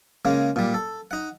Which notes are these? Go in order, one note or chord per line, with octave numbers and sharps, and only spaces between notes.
C#3 G#3 A#3
A#2 G3
A4
D#4 F#5